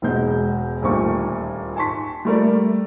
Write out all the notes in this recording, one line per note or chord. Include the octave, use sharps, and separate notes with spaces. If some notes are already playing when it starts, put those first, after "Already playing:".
E1 B2 G#3 G6
D#1 D2 A#2 C#6
G#5 A5 C6 C#6 B6
G3 A3 A#4 D5